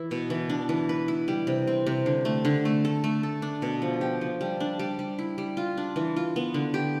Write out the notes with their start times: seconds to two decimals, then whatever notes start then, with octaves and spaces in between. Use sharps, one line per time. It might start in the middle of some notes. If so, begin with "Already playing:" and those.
Already playing: E3 E4
0.11 B2
0.30 E3
0.49 D4
0.69 E3
0.89 B4
1.08 E4
1.28 G3
1.47 C3
1.67 C4
1.86 C3
2.06 D3
2.25 A3
2.45 D3
2.65 A3
2.85 A4
3.04 A3
3.23 A4
3.42 D4
3.62 B2
3.82 F3
4.01 G4
4.21 F3
4.41 G3
4.60 D4
4.79 G3
4.99 G3
5.19 E4
5.38 G3
5.57 F4
5.77 D4
5.96 E3
6.16 F4
6.36 B3
6.54 D3
6.74 G4